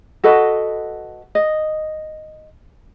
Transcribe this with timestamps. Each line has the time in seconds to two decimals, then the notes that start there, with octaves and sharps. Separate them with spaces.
0.24 F#4 A4 B4 D#5
1.35 D#5